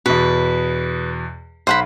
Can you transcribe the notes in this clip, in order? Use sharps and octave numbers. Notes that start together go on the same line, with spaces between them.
E2 B2 B4
B1 C5 F#5 B5